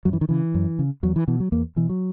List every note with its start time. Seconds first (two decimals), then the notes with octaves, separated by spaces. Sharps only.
0.05 F#2 F#3
0.13 E3
0.21 D#3
0.29 C#3 E3
0.54 F#2
0.79 C#3
1.03 E2 F#3
1.16 E3
1.28 B2 E3
1.40 F#3
1.52 E2 A#3
1.76 B2 E3
1.89 F#3